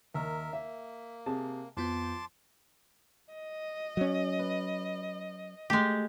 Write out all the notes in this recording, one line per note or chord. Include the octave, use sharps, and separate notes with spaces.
D#2 A#4 E5 A#5
A#3 E5
C3 G#4 A5
F2 F3 B3 A5 C6 D6 G6
D#5
F#3 C#4
B4
G#3 A3 G4